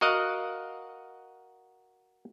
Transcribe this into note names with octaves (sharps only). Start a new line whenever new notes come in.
F#4 A#4 D#5 F5 F#5